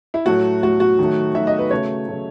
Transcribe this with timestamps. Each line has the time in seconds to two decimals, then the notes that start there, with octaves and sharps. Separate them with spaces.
0.14 E4
0.26 A2 F#3 A3 F#4
0.63 A2 F#3 A3 F#4
0.80 F#4
0.99 D#3 F#3 A3
1.34 D#3 F#3 A3 E5
1.47 D#5
1.59 B4
1.71 C#3 F#3 A3 C#5
2.08 C#3 F#3 A3